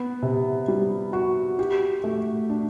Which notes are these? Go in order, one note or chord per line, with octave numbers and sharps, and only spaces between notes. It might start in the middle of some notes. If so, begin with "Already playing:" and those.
Already playing: B3
C3
G3
F#4
G4
A3
D4